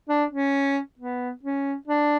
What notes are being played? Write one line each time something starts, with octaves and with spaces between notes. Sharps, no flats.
D4
C#4
B3
C#4
D4